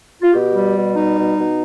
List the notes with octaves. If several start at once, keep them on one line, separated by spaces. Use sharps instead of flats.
F4
B2 G4
G3
B2
G3 D#4
B2
B2